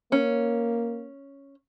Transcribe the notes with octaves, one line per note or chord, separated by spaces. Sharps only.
A#3 C#4